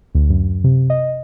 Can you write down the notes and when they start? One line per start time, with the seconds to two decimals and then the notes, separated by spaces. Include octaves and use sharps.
0.15 D2
0.29 F#2
0.64 C3
0.90 D#5